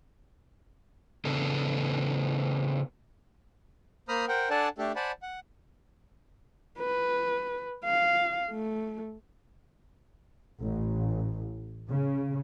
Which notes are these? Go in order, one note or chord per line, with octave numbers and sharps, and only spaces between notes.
C#3 B3 D4 A4
A#3 C5 A#5 B5 D#6 F6
A#4 C5 F#5 G5
D4 A4 D5 F#5 G#5 A5
A3 D4 G4 A4
C5 D5 F#5 G#5 A5 B5
F#5
B4
F5
A3
A1
C#3